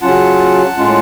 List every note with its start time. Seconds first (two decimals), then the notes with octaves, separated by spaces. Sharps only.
0.02 C#3 F#3 C#4 F4 F#5 A5
0.77 A2 G#3 C#4 F4